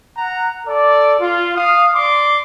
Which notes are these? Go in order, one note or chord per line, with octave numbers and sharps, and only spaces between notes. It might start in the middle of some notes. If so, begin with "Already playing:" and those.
F#5 A#5
A4 D5
F4
F5 D#6
D5 C6 D6